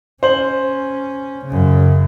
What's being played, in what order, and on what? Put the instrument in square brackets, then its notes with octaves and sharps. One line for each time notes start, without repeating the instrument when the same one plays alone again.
[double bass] C#4 [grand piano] C5 F#7
[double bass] F#2 C#3